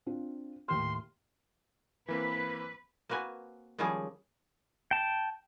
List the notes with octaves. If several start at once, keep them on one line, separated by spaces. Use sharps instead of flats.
C4 D4 F4
D#2 A2 C6 F6
E3 A#3 C4 B4
A#3 C4 F#4 B4 G#5
D#3 F3 G3 G#3 C#4 G#4
G5 A5